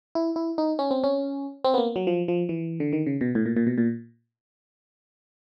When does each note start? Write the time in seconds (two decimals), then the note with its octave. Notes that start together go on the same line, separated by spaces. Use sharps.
0.15 E4
0.36 E4
0.58 D#4
0.79 C#4
0.91 C4
1.04 C#4
1.65 C4
1.74 B3
1.78 A#3
1.96 F#3
2.07 F3
2.28 F3
2.49 E3
2.80 D3
2.93 D#3
3.06 C#3
3.21 B2
3.35 A2
3.46 A#2
3.57 A#2
3.67 B2
3.78 A#2